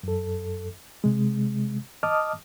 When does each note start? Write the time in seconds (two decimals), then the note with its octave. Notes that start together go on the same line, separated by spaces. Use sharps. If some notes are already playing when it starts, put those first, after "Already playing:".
0.03 F#2 A4
1.04 C3 G#3
2.03 D#5 A5 D6 D#6 F6